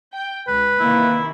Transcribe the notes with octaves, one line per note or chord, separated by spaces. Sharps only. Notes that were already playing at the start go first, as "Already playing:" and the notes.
G5
C#2 B4
C3 D#3 E3 A#3 E4